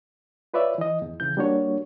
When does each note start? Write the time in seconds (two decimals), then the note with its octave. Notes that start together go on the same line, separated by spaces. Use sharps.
0.54 F4 B4 C#5 D5 E5
0.78 E3 D#5
1.02 E2
1.20 C#3 E3 G6
1.37 G3 A#3 D4 F#4 C#5